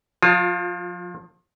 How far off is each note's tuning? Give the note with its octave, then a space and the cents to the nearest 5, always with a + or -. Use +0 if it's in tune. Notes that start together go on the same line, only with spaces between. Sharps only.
F3 +35 F4 +10